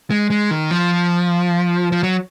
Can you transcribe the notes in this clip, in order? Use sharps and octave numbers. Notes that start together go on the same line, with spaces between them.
G#3
G#3
D#3
F3
F3
F#3